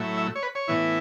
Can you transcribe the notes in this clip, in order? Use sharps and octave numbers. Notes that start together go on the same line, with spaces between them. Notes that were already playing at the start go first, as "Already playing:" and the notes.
Already playing: A2 F#3 A3 E4
E5
C#5
B4
C#5
A2 E3 B3 E4